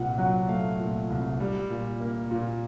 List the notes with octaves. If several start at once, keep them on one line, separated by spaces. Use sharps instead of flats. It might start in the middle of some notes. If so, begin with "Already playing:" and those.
Already playing: C2 A#2 F#5
F#3 F#5
A3 F5
A#2
C2
G3
A#2
A#3
A#2